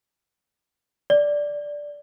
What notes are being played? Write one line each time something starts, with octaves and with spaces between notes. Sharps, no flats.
D5